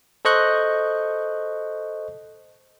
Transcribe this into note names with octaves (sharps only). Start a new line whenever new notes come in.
A4 C5 D#5 C#6 F#6 G6